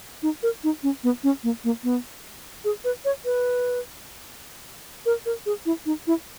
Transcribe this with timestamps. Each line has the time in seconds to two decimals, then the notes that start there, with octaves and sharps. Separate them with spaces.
0.23 D#4
0.43 A#4
0.64 D#4
0.83 C#4
1.04 B3
1.24 C#4
1.43 A#3
1.64 A#3
1.84 B3
2.65 G#4
2.84 B4
3.05 C#5
3.25 B4
5.06 A#4
5.26 A#4
5.46 G#4
5.66 E4
5.86 D#4
6.07 E4